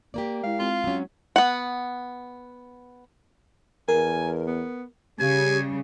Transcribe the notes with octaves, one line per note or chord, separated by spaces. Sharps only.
A#3 G4 A#4 D5
G#3 E4 F5
G#3 C4 F4
F#3 C#4
B3 F#5
E2 A#4 G#5
B3
C#3 G3 G4 G#5